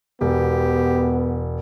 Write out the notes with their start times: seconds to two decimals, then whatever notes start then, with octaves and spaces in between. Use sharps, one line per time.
0.21 E1 B3 G4